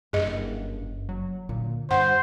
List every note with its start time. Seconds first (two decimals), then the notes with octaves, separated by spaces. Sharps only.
0.13 F#1 G2 G#4 D#5
1.09 F#3
1.49 A#2 D3
1.91 G2 C5 F#5